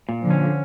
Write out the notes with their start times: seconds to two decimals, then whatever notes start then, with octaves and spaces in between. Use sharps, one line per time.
0.09 A#2
0.23 D3 F3
0.30 C#4